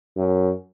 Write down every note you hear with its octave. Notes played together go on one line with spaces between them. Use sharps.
F#2